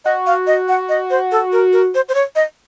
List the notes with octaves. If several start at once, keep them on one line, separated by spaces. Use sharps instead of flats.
F#4 D#5
F5
D#5
F#5
D#5
C5
A4
A#4
A#4
C5
C5
C#5
D#5